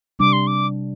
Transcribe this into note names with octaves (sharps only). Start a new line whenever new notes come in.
C3 G3 D4 D6
C6
D6